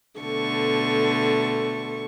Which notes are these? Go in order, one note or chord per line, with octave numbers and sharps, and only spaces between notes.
B2 D3 A3 C#6